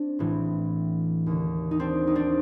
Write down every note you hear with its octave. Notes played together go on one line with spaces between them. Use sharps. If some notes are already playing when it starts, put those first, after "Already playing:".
Already playing: C4 D4
A1 A2 E3
D#2 D3
D#4
C4 D4
D#4
C4 D4